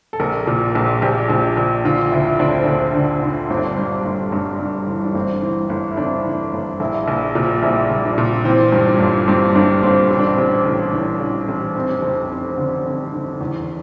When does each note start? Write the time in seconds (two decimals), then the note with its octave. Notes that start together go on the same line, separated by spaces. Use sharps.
0.13 A4
0.20 A#1 A#4
0.47 A#2
0.75 A#1
1.02 A#1 G4
1.30 A#1
1.57 A#1
1.85 D3 F4
2.12 D2 E4
2.39 D2 D4
2.52 C4
2.64 D2 D4
2.95 D3
3.22 D3
3.50 G1 C4
3.57 D4
3.64 C4
3.78 G2
4.05 G1
4.32 G2 D4
4.59 G2
4.87 E3
5.04 D4
5.15 G1 C4
5.42 E3
5.70 G1
5.91 E4
5.97 F2 D4
6.25 E3
6.53 G1
6.80 A#1 E4
7.08 A#1
7.35 A#2
7.62 A#1 E4
7.90 A#1
8.04 D4
8.18 A#2
8.45 E3 C4
8.72 G2
8.86 D4
9.00 G1
9.28 G2 C4
9.55 G1 D4
9.83 G1 C4
10.10 A1 C4
10.19 D4
10.27 C4
10.38 A1
10.65 A1
10.92 E3 D4
11.20 A1
11.48 A1
11.75 F1 C4
12.02 F2
12.31 F1
12.51 C4
12.57 D3 D4
12.85 F1
13.13 D3
13.40 E2